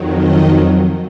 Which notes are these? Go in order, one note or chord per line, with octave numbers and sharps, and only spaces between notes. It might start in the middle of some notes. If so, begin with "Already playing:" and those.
Already playing: F2 D#3 F#3
D#5